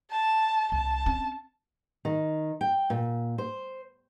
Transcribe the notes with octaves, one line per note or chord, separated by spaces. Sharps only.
A5
C2 A5
C4 C#4
D#3
G5
A#2
C5